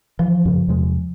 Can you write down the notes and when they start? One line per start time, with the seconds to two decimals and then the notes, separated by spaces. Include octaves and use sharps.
0.19 E3 F3
0.45 F#2 C#3
0.68 E2 C3 G#3